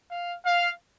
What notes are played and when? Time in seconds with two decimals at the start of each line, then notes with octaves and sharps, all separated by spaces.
0.09 F5
0.46 F5